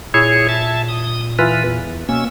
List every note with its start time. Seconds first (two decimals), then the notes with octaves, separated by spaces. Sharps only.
0.14 A#2 E4 G#4 C#5
0.49 E5 A5
0.88 D#6
1.39 E3 F4 B4
1.64 E2
2.09 B2 A#3 C#4 E6